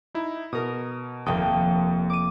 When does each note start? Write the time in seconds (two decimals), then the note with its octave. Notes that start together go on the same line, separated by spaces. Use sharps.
0.14 D#4 E4
0.53 B2 A#4 D#6
1.26 F1 D#2 A#3 G5 D#6
2.10 D6 D#7